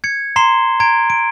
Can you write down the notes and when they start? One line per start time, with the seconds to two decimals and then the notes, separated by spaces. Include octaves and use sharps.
0.04 G#6 C#7
0.36 A#5 C6 C7 E7 G7
0.80 A#5 G#6 D7
1.10 D7